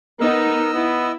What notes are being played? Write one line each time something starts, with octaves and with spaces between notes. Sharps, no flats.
B3 D#4 A#4 D#5 E6
B3 E4